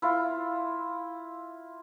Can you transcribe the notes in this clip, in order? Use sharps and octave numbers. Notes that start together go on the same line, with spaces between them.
E4 F4